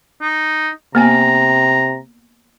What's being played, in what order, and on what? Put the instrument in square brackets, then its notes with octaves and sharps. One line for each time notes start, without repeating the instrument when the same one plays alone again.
[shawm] D#4
[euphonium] C3 [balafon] A#3 B3 G#5 [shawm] A#5